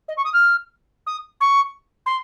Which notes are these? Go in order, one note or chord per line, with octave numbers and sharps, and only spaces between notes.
D#5
C#6
D#6
F6
D#6
C#6
C6